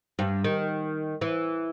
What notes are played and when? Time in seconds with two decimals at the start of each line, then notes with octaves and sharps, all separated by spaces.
0.19 G2
0.44 D#3
1.21 E3